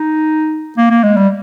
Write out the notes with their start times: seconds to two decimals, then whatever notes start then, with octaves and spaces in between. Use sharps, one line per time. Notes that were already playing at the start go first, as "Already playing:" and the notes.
Already playing: D#4
0.78 A#3
0.90 A#3
1.03 G#3
1.17 G3